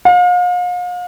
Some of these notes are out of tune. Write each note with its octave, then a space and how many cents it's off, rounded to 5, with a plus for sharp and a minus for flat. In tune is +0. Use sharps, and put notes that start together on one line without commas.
F5 +40